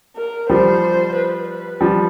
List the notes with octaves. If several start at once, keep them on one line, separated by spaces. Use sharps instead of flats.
A#4
F3 G3 C5
B4
B4
F3 G3